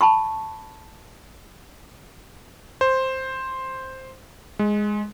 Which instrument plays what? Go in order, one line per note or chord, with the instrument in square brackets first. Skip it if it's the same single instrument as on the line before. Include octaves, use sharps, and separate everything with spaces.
[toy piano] A5 B5 C#6
[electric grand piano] C5
G#3